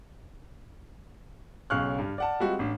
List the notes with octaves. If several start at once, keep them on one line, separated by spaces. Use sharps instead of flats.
B1 C#3 F5 C#6 F6 F#6
G2
D5 F#5 A5
G3 G#3 C4 F4 F#4
A1 D4